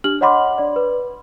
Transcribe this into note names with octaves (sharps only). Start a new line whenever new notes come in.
D4 G4 F6 F#7
C#5 D#5 F#5 B5 C6 D6
D4 D5
B4